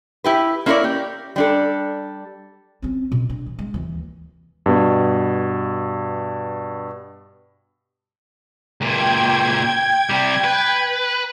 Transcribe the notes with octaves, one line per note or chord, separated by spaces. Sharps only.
E4 G4 B4
A#3 C#4 E4 A#4 C#5 D5
G4
G3 D4 A4
C4 C#4
B2
D4
E3
G#3
D#2 E3
G2 B2
C#2 A#2 G5 G#6
C3 G3
B4